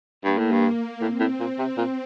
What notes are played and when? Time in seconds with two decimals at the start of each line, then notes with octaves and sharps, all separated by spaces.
0.24 G2 A#3
0.38 A2
0.52 G2
0.63 A#3
1.01 A2 C4
1.20 A2
1.39 A#2 C4
1.59 C3
1.77 A#2